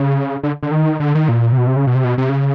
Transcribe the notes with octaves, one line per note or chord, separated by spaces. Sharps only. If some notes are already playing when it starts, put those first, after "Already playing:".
Already playing: C#3
D3
D3
D#3
D3
D#3
A#2
C3
B2
C3
C#3
B2
C3
B2
C3
C#3